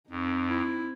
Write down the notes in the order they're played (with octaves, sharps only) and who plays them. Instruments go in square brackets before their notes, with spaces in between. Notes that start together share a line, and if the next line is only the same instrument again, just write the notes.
[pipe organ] F2 [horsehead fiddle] C4 D#4
[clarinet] E4